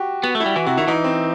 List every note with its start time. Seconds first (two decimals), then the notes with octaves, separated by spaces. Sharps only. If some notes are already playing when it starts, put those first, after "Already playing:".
Already playing: F#4 G4
0.23 B3 F#4
0.35 A3
0.40 E4
0.46 G3
0.56 E3 F#4
0.66 C3 F#4
0.78 D#3 E4
0.87 E3 D#4
1.04 C4